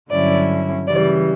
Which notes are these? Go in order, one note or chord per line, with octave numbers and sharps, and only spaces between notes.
G2 D3 F#3 C#4 E4 D5
C#3 E3 G3 D5